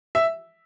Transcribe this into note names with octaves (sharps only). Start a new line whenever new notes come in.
E5